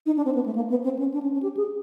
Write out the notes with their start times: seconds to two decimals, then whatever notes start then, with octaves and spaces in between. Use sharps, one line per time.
0.06 D#4
0.17 D4
0.25 C4
0.35 B3
0.46 A3
0.56 A#3
0.70 B3
0.84 C4
0.99 C#4
1.14 D4
1.23 C#4
1.33 C#4
1.43 G4
1.57 G#4